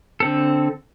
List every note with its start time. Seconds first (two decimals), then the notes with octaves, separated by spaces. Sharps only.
0.20 D3 C4 A4